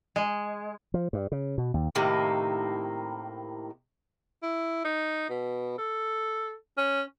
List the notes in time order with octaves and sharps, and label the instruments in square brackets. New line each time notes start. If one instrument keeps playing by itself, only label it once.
[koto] G#3
[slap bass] F3
G2
C#3
B2
D#2
[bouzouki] A2 C3 D#3 A#3
[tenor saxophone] E4
D#4
B2
A4
C#4